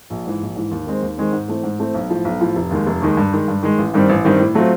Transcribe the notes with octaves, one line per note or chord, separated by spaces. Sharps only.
A#1
G#2 E3
A#1
G#2 E3
D#2
D#3 G#3 C4
D#2
D#3 G#3 C4
G#2
E3 A3 C4
G#2
E3 A3 C4
B1
A2 F3
B1
A2 F3
F1
D#2 D#3 G#3
F1
D#2 D#3 G#3
G2
D#3 G#3
G2
D#3 G#3
A1
G2 D#3 G3 C4
A1
G2 D#3 G3 C4
A2
F#3 A3 C4 F4